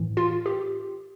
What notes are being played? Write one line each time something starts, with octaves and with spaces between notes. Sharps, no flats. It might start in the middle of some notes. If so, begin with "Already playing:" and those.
Already playing: A2 E3
F4
G4